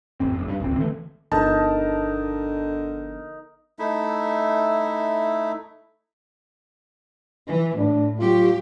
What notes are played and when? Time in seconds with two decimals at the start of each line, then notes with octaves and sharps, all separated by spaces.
0.20 A1 F2 C4
0.36 F#1
0.48 G2
0.60 D#1 G#1 C#2 C4
0.77 D3 E3 A3
1.32 G1 D3 F3 B3 D#4 A#4 A5
3.79 A3 D#4 E4 E5
7.47 E3
7.78 A2 D4
8.19 F#3 F4 G4